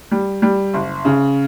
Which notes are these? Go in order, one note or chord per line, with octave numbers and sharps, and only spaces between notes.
G3
G3
F#1
C#3